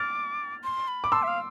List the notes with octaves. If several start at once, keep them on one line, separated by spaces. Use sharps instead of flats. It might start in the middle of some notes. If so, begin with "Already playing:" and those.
Already playing: D6 F6 A6
C6
B5
D6
A5 C6 E6
E5
F5